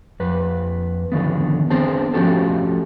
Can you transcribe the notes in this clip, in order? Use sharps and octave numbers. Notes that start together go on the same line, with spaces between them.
F2 B4
D3 D#3 F3 B3
B3 C4 D4 G#4 C5 A5
F3 A3 C#4 F#4 G4 A4